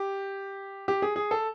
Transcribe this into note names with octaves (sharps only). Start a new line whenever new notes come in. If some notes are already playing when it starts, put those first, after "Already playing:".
Already playing: G4
G4
G#4
G#4
A4